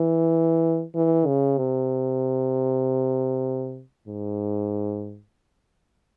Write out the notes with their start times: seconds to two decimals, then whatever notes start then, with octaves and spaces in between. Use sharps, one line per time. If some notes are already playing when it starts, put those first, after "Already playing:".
Already playing: E3
0.95 E3
1.27 C#3
1.58 C3
4.08 G#2